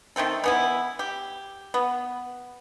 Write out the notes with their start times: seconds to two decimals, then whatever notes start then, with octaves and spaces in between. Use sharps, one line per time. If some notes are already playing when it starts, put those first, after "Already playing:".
0.16 D#3 A3 C4 A4
0.44 E3 B3 E4
0.99 G4
1.74 B3